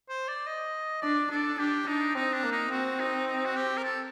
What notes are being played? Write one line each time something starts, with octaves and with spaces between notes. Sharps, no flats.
C5
D5
D#5
D4 D5
D4 A4
D4 G4
D4 D#4
C4 D#4
D4
A#3
D#4
C4 F#4
D#4
D#4
F#4
G4
A#4
A4